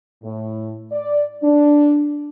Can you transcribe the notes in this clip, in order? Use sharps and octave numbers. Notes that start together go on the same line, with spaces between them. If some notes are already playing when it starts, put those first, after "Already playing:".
A2
D5
D4